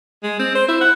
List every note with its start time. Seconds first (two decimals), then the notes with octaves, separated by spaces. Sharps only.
0.23 G#3
0.39 C4
0.55 C5
0.68 E4
0.81 F#5